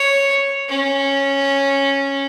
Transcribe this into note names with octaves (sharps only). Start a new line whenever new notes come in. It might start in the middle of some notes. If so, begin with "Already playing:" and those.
Already playing: C#5
C#4